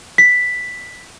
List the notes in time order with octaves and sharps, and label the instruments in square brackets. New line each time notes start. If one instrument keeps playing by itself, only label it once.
[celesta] B6